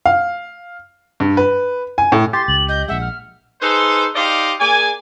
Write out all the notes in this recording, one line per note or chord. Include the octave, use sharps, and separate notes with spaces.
F5
G2
B4
G#5
A2
G4 C6 A6
C#2 F#7
D#5 G6
A#1 G#3 E5 F#5
F6
D#4 G#4 A4 B4 C5
D#4 G4 C5 D5 D#5 F5
A#3 G#4 D5 G#5